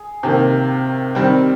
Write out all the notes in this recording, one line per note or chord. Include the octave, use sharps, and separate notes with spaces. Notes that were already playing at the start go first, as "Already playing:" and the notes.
Already playing: G#4
C3 D#3 A#3
D#3 G3 C4